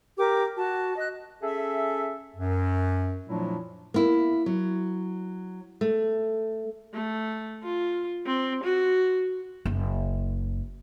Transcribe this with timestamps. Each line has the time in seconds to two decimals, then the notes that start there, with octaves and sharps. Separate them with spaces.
0.17 G4 A#4 D6
0.56 F#4 A5
0.97 D#5 F#6
1.43 C#4 G#4 A4 E5
2.35 F#2
3.27 A#2 F3 F#3 A3 D4 E4
3.94 A#3 E4
4.46 F#3
5.81 A3
6.94 A3
7.63 F4
8.26 C4
8.64 F#4
9.65 F#1